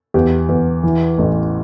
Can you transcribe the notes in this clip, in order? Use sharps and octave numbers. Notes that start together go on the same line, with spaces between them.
E2 G4
E2
E3
A1